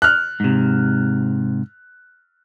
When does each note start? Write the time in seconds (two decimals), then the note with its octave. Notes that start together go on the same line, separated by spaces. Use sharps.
0.02 F6 F#6
0.40 G#2 C3